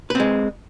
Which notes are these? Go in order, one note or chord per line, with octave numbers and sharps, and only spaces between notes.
G#3 C4 B4